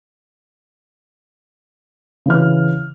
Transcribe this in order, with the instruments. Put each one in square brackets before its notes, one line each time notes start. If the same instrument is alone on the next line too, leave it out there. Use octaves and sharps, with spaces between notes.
[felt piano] C#3 E3 F6